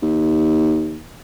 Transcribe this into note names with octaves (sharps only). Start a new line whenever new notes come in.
D#2